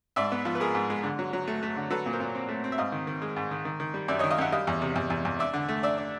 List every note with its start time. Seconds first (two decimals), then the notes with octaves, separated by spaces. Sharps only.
0.16 G#2 D5 E5
0.32 B3
0.45 F3
0.55 B4
0.60 G#3 G#4 A#4
0.75 G#2
0.90 G#3
1.03 D3
1.19 F#3
1.33 F#3
1.47 A3
1.63 A3
1.76 D3
1.90 F#3 A4 B4
2.06 A#2
2.12 A#4 C5
2.20 A#2
2.35 C4
2.49 A3
2.64 C4
2.72 E5
2.78 G#2 D#5 F5
2.92 D#3
3.07 D#3
3.22 G#3
3.36 G#2
3.51 D#3
3.65 D#3
3.80 D#3
3.94 G3
4.08 F#2 D5 E5
4.19 C#5 D#5
4.24 D#3
4.31 D#5 F5
4.38 F#2 E5 F#5
4.52 G3 D#5 F5
4.67 E2
4.82 C3
4.96 E2
5.10 E2
5.25 E2
5.39 D4 D5 E5
5.54 D3
5.69 A3
5.83 D4 D5 E5
5.98 D4